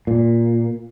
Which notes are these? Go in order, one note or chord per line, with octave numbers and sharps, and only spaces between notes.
A#2